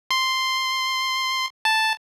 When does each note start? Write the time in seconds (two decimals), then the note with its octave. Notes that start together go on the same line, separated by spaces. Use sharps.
0.11 C6
1.65 A5